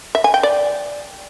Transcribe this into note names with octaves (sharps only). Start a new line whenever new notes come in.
E5
G#5
G5
D5